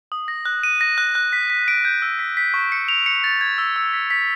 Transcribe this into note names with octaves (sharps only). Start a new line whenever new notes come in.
D#6
A#6
F#6
D#7
A#6
F#6
F#6
B6
B6
D7
G6
E6
B6
B6
C#6
C#7
F7
C#7
A6
G#6
E6
E6
B6
B6